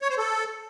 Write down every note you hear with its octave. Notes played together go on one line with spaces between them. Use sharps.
C#5
C5
A4